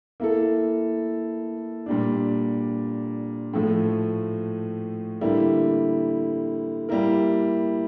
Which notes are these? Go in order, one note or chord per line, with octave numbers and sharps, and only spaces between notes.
A#3 E4 A4
A#2 G3 D4
A2 F3 A3
D3 G3 A#3 E4
G3 A#3 E4 A#4